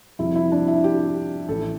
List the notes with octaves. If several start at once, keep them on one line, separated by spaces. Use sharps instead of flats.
F2 C3 G3 E4
E4
D4
E4
G4
A1 A2 E3 A4